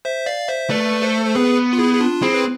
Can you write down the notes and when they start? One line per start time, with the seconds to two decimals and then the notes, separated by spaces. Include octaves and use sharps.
0.05 C5 E5
0.26 D5 F5
0.48 C5 E5
0.70 A3 B4 D5
1.02 A4 C5
1.26 C5
1.35 B3 G#4 B4
1.73 F4
1.78 E4 G#4
1.94 G#4
2.01 D4 F4
2.22 C4 E4 G#4
2.34 B4